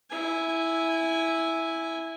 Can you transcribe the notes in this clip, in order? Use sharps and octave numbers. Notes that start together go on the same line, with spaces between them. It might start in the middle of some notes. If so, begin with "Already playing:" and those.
E4 G#5